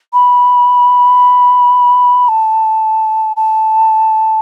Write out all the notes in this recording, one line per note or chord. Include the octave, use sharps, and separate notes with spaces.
B5
A5
A5